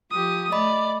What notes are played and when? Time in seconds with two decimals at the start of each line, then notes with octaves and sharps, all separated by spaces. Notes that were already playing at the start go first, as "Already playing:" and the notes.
0.11 F3 G4 D#6
0.52 A3 D5 D#5 B5